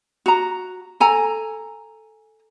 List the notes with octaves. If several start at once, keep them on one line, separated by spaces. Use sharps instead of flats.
F#4 A#5
A4 G#5 A#5